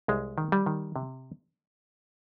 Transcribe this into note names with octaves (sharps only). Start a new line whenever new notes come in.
C2 G#3
D#3
G3
D#3
C3